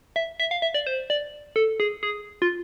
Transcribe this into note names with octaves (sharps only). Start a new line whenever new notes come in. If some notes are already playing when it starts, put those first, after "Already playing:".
E5
E5
F5
E5
D5
C5
D5
A4
G#4
G#4
F4